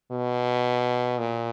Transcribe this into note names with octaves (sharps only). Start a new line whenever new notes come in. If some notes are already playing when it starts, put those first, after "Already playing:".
B2
A#2